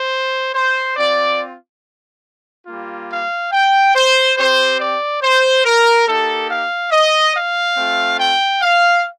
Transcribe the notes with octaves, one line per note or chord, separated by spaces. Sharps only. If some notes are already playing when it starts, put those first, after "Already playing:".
Already playing: C5
C5
C4 F4 D5
G3 A#3 F4
F5
G5
C5
C4 G4 C5
D5
C5
A#4
A#3 D#4 G4 A4
F5
D#5
F5
A3 C4 F4
G5
F5